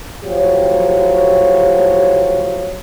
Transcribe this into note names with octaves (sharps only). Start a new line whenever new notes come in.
A2 F3 F#3 G4 C#5